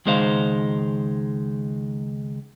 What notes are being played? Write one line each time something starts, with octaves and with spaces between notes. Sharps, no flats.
C#2 D#3 G#3 D#4 C5 F5